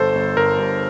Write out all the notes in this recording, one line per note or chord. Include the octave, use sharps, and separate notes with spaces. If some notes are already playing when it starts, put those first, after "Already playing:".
Already playing: G1 A4 C5
G1
G1 A#4
G2